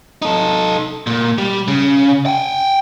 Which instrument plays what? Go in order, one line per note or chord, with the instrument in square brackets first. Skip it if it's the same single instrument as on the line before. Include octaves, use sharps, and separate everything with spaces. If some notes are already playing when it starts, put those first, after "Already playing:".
[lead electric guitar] D#4 A4
A#2
G3
C#3
F#5 G5